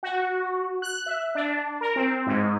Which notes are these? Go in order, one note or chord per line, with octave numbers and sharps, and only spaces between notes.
F#4
F#6
E5
D4
A#4
C4
G#2